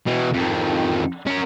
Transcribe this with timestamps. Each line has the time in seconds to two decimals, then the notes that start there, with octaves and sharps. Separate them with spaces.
0.06 B2 E3
0.33 F2 D#3
1.27 C#4 A#4